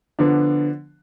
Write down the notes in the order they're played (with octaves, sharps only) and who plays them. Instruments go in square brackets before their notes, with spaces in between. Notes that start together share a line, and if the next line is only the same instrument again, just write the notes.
[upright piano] D3 F3 B3 D4